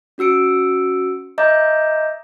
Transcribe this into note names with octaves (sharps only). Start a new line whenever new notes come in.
C#4 F#4 E6 C#7 D7
D#5 E5 A#5 D6 G6